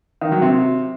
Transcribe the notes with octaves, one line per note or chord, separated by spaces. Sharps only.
D#3
F#3
C3